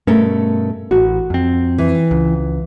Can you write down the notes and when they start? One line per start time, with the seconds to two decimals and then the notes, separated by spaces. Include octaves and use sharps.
0.07 G2 B2 A3 C#4 A4 A#4
0.91 A1 F#4
1.30 F2 C4
1.78 E3
2.11 C#2